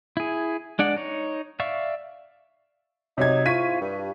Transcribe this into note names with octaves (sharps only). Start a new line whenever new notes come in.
E4 G#4
G#3 D4 D5 F#5
D#4 C#5
D5 E5 F5 C#6
C3 F#3 D#4 G#6
G#2 E4 F4 C#6 B6 D#7
G2